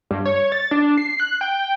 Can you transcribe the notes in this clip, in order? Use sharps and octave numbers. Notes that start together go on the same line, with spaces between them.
G2
C#5
A6
D4
C7
F#6
G5